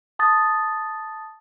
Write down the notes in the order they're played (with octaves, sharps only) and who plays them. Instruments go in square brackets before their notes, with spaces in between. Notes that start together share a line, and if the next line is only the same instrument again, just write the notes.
[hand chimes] A5 D#6 A6